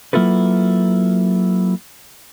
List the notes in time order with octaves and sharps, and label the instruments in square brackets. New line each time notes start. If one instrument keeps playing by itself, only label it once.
[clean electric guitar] F#3 A#3 E4 F4 A4 B4